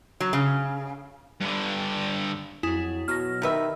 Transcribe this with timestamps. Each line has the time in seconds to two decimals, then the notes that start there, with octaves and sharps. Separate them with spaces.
0.20 F#3
0.33 C#3
1.40 G2 D3
2.63 F2 F#3 E4 G#4
3.08 B2 F#3 F6 A#6
3.42 C3 D#3 B4 E5